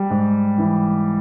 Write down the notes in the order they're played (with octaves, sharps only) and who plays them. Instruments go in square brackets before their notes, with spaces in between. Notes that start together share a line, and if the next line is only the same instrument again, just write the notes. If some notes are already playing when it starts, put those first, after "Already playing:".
Already playing: [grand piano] G3
G#2
E3